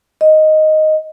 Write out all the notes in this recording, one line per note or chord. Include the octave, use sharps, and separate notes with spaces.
D#5